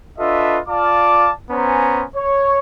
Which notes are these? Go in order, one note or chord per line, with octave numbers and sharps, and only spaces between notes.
D4 F4 A4 B4 D#5 E5
F4 D5 F5 A5 D6
B3 C#4 C5 G#5 A#5
C#5